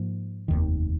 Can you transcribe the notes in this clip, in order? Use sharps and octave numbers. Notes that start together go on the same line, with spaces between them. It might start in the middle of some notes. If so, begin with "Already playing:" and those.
Already playing: G#2 F3 A#3
F1 D#2 D#3